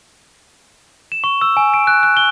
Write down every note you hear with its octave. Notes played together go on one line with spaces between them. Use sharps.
E7
C#6
E6
G#5
D7
F#6
F#6
G7